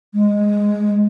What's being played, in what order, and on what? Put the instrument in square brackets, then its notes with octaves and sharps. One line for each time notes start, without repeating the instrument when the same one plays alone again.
[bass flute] G#3